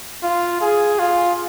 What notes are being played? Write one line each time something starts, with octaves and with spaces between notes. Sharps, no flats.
F4
G#4
F4